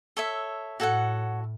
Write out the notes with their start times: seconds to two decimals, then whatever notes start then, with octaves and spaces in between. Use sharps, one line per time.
0.17 A4 C#5 E5
0.80 A2 F#4 A4 C#5 F#5